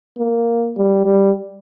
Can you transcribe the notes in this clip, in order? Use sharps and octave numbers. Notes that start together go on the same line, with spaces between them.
A#3
G3
G3